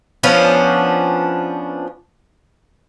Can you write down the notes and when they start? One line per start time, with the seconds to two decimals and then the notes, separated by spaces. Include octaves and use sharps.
0.23 F3 B3 C#4 D4